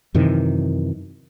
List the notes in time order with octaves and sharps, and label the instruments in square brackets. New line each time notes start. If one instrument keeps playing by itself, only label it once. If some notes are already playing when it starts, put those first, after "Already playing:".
[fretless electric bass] F#2 C3 D#3 E3